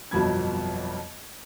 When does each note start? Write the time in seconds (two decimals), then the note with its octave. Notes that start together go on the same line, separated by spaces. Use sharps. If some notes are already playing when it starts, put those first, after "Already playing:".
0.11 G1 F2 B2 F#3 B5 G#6